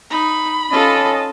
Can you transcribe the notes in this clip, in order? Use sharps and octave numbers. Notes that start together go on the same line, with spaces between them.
D#4 B5
C#4 F4 A4 D#5 A5